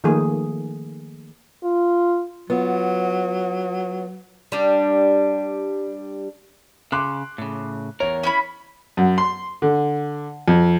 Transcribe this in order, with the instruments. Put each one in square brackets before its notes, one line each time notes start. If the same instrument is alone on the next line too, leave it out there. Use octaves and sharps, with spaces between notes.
[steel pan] D#3 F3 A3 A#3 G#4
[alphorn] F4
[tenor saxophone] F#3 [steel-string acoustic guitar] B3 F4
[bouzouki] G3 D4
[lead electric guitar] C#3 [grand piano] C6 D6 F#6
[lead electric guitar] A2 C#3
[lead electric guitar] E2 A#4 [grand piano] C#5
[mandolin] C#4 E4 B5
[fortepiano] F#2
C6
D3
F2